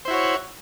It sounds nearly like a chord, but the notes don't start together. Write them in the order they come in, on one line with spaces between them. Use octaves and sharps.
C5 E4 F#4 C#5